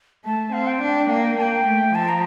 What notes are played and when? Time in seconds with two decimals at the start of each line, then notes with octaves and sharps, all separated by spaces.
0.24 A3 A5
0.53 C4 F5
0.67 G5
0.81 D4
1.09 A#3 F5
1.24 G5
1.38 A#3 A5
1.42 G5
1.66 A3
1.95 F3 A5
2.09 A#5